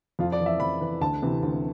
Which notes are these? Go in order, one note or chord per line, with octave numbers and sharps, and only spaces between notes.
F2 F4
D5
E3
E5
F2 B5
E3
D2 A5
C3 E3
D2